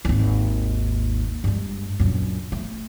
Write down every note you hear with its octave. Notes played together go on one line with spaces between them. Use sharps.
G#1 D#2
G2 G#3
A#1 F#2
A3